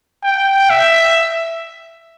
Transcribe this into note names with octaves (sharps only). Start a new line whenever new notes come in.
G5
E5